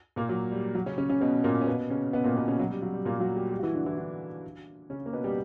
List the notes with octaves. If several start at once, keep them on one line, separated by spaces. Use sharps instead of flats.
A#2 A#3
F#3
G3
F#3
C#3 C#4
C#3 C#4
C#3 C#4
B2 B3
A#2 A#3
C#4
B2 B3
C#3 C#4
B2 B3
A#2 A#3
B2 B3
C#3 C#4
F#3
G3
F#3
G3
A#2 A#3
F#3 F#4
G3 G4
G3 G4
F#4
E3 E4
D3 D4
E3 E4
D3 D4
C#3 C#4
A#3
B2 B3
G3 G4